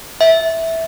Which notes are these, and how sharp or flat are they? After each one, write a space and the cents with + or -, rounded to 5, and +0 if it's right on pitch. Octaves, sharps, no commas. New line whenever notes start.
E5 -10